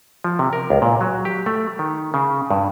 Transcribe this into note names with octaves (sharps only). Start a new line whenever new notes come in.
F3
C3
A#4
C#2
A#2
F#3
G4
A3
D#3
C#3
G2